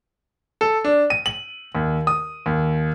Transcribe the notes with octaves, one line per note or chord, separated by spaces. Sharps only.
A4
D4
D#7
F#7
D#2
D#6
D#2